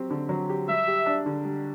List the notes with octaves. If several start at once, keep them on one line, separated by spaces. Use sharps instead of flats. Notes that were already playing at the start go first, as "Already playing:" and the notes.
Already playing: F#3 C4 G4
D3
F#3
G4
G3 E5
G4
D4
D3
G3